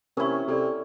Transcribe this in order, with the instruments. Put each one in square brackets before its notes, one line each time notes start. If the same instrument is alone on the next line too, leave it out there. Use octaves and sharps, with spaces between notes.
[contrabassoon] C3 [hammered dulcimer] C#4 E4 [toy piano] A#4 C#6
[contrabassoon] C3 [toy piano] G4 A4 D5